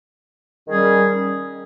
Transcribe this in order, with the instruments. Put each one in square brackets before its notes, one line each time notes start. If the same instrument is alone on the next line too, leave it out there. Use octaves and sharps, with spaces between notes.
[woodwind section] D#3 G3 C#4 G#4